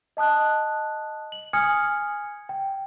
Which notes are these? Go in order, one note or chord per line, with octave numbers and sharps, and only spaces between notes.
D#5 A5 D#6 F#6
F#7
G#5 D#6 F6 G#6 C#7
G5